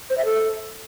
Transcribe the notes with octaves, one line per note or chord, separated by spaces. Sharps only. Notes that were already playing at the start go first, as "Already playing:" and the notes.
C5
E5
A4